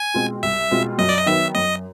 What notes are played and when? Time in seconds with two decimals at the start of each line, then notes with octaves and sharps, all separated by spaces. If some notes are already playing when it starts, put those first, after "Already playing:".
Already playing: G#5
0.14 B2 G#3 C4 F4
0.43 C2 E5
0.71 B2 G#3 C4 F4
0.98 F#2 D#5
1.09 D5
1.18 D#5
1.26 D#3 F#3 B3 E5
1.55 F#2 D#5